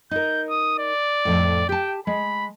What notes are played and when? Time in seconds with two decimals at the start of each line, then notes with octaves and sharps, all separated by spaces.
0.11 D#4 A#4 G6
0.50 D#6
0.79 D5
1.25 F2 A2
1.69 G4 G5 A5
2.07 G#3 B5